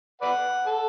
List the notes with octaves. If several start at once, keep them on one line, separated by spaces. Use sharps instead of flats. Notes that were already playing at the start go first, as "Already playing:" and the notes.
B4 D5 F#5
A4